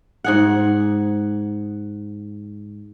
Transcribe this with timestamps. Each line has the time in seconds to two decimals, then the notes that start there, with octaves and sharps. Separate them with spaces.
0.24 G#2 G#4 F#5